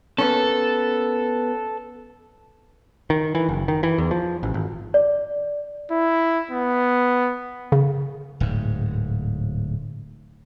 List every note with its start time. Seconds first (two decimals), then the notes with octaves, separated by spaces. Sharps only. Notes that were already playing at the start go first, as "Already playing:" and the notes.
0.18 A#3 B3 C#4 A4
3.10 D#3
3.35 E3
3.49 F#1
3.68 D#3
3.83 E3
3.98 E2
4.11 F3
4.43 A1
4.54 G#1
4.94 D5
5.91 E4
6.51 B3
7.72 C#3
8.40 D1 G#2